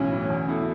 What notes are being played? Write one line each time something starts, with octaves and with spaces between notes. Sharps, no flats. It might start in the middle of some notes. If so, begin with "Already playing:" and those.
Already playing: B1 A2 E3 C#4
A2 E3
E2
B2 A3 E4